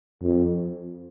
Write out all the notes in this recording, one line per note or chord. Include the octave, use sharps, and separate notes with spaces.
F2